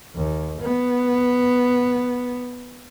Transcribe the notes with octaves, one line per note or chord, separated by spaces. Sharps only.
D#2
B3